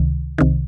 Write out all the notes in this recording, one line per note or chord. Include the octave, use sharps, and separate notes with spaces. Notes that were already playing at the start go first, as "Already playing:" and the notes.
Already playing: C#2 C3 D#3
C2 C3 D#3